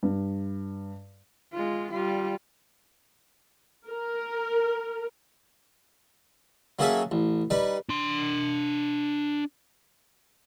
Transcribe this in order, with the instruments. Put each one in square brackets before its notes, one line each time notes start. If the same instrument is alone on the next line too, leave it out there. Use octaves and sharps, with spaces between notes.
[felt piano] G2
[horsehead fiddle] G#3 F4
G3 F4
[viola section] A#4
[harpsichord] F#3 A#3 C#4 G#4 A4 E5
A1
G3 D#4 B4
[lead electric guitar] D4 C6